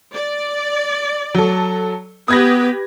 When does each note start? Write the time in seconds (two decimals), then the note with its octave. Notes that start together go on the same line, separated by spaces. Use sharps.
0.15 D5
1.35 F#3 A4
2.28 B3 G4 B4 D#6 G#6 A#6